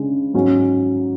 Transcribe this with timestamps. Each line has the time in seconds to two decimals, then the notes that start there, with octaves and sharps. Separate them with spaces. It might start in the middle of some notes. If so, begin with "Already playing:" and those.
Already playing: C#3 G#3 D4
0.34 G#2 F#3 C#4 F#4